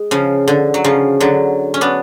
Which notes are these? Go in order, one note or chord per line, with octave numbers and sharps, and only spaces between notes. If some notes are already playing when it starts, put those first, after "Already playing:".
Already playing: G#3
C#3 F3
D3
F#3
C#3 F3
D3 F#3
C#4
B3 D4